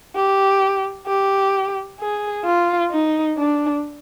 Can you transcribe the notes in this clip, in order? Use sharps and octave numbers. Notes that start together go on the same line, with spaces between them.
G4
G4
G#4
F4
D#4
D4